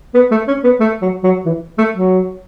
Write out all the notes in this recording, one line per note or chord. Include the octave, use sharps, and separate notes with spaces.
B3
A3
C#4
B3
A3
F#3
F#3
E3
A3
F#3